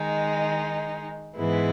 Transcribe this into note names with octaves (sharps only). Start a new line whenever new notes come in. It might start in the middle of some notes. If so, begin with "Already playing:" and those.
Already playing: D#3 G#3 D#4
G#2 E3 G#3 B3 E4